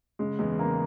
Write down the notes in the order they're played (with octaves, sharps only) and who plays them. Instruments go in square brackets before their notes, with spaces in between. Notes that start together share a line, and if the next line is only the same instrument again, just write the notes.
[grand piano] C#3 [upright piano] G#3
[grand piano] E2 [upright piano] G#3
[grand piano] C#3 [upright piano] A#3